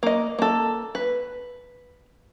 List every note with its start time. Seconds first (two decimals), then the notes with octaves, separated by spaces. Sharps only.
0.03 A#3 D#5
0.39 A#3 A4
0.95 B4